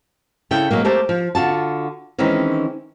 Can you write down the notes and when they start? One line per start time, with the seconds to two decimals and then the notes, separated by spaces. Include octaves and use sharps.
0.51 C#3 E4 A4 C#5 G5
0.70 B2 F#3 G#3 A#3
0.85 A3 A#3 G4 C5 A5
1.09 F3
1.35 D3 F4 F#4 A5
2.18 D#3 E3 G#3 C4 C#4 D#4